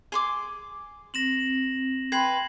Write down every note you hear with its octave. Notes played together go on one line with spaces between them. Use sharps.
G#4 C6 D6
C4 A#6 E7 F#7
B4 G5 B5 C6 G#6 C7 F#7